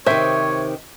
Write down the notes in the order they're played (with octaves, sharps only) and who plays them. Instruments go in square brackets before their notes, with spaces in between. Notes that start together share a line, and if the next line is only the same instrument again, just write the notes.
[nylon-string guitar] C3 D#3 [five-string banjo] C5 E5 [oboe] C#5